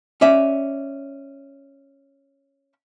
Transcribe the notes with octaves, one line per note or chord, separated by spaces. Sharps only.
C#4 D5 E5